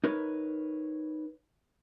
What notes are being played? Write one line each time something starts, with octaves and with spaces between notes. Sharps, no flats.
D#4 A#4 B4 C#5